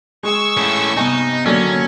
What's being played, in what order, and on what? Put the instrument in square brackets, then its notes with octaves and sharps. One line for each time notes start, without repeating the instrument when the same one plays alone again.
[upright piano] G#3 G#4 [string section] C#6 E6
[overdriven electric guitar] A2 C#4
[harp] G2 C3 B3 [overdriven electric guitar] D#4 [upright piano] G#5
[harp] D3 D#3 A#3 [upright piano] F#3 A4 D5 [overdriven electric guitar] C#4 [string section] C#5